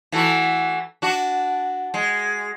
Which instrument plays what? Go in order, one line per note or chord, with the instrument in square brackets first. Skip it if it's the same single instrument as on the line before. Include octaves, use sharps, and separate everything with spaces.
[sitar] E3 A3 F#4
D4 F#4
G#3